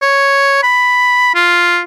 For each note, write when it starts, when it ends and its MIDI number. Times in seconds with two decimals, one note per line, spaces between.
0.02 0.60 73
0.63 1.33 83
1.35 1.80 65